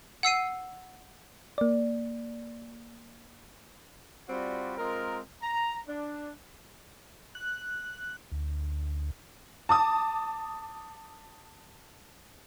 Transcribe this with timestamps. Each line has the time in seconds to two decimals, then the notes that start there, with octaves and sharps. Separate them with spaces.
0.23 F#5 E6 C7 D#7
1.58 A#3 D5
4.29 G3 C4 F4 F#4 D5 B5
4.78 G#3 C4 F4 A#4
5.43 A#5
5.88 D4
7.35 F#6
8.32 D2
9.69 A5 D6 D#6